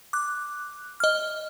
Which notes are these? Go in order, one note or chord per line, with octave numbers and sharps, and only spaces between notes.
D6 F#6
D#5 F6